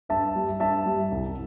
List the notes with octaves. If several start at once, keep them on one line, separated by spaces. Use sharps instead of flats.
G2 E5 A5
G3
G2 E5 A5
G3
C2